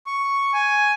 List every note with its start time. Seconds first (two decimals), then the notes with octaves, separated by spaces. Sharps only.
0.06 C#6
0.53 G#5